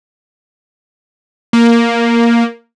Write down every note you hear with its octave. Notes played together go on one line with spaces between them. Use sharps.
A#3